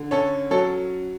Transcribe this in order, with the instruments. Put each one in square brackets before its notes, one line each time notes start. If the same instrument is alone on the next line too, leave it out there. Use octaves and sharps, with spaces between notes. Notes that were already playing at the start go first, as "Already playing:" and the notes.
Already playing: [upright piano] D3
C#4 A4 C#5
F#3 A4 C#5